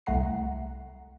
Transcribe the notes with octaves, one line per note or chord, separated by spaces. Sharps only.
C2 A3 F#5 A#5 C7